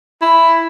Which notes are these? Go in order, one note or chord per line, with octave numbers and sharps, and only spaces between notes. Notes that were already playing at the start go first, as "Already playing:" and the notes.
E4